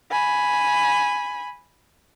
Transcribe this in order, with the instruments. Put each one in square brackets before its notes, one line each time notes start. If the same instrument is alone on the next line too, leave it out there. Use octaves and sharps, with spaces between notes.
[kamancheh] G#5 B5